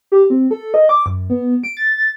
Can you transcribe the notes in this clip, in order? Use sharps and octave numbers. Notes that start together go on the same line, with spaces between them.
G4
C4
A4
D#5
D6
F#2
B3
D7
A6